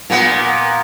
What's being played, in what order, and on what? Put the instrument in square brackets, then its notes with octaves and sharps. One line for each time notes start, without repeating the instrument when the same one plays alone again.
[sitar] A#2 A#3 B3